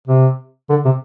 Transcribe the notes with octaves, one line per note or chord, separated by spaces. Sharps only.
C3
D3
C3